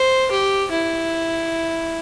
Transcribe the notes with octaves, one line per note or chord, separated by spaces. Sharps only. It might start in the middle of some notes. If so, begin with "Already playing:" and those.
Already playing: C5
G4
E4